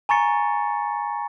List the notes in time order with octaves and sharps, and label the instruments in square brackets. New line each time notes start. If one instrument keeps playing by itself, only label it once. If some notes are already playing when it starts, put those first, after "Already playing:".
[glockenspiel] G#5 A#5 C#6 A6 C#7